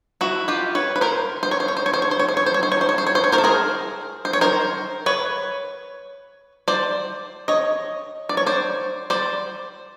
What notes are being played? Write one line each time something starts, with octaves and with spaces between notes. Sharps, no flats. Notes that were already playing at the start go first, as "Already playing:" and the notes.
E4 F#4
F4 G4
B4 C#5
B4
A#4 C5
C5
C#5
C5
C#5
C5
C#5
C5
C#5
C5
C#5
C5
C#5
C5
C#5
C5
C#5
C5
C#5
C5
C#5
C5
C#5
A#4 C5
A4
G#4 A#4
C5
C#5
A#4 C5
B4 C#5
C5 D5
C#5 D#5
D5
C#5
C5 D5
C5 D5